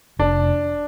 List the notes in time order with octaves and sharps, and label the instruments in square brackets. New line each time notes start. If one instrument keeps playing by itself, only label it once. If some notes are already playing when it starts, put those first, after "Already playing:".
[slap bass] F1 [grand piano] D4